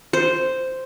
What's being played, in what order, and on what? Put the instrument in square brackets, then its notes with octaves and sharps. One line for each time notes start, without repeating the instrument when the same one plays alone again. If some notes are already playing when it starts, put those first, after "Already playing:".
[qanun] C5